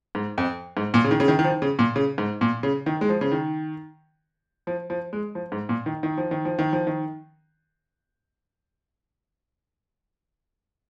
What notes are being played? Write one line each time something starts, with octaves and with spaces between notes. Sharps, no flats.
G#2
F2
G#2
A#2
C#3
D#3
C#3
D#3
D#3
F3
C#3
A#2
C#3
G#2
A#2
C#3
D#3
G#3
F3
C#3
D#3
F3
F3
G#3
F3
G#2
A#2
D#3
D#3
F3
D#3
F3
D#3
F3
D#3